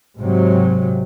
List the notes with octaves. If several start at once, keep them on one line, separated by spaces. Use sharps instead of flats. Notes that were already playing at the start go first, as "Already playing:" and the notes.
G#2 C3 F#3